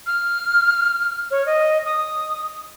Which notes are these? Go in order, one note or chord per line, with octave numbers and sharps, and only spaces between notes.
F6
C#5
D#5
D#6